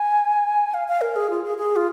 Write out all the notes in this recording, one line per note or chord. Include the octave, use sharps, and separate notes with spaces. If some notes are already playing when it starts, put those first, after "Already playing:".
Already playing: G#5
F5
F5
A#4
G#4
F4
G#4
G#4
F4